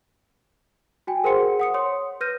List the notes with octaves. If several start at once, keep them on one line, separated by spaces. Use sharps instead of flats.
F#4 G5 G#5
G#4 A#4 C5 F#5 C6 C#7
F#5 D#6 C#7
C#5 C6 D#6
B4 F6 G6 A#6 D#7